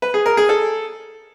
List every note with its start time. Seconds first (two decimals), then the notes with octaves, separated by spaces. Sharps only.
0.02 B4
0.14 G#4
0.26 A#4
0.37 G#4
0.49 A4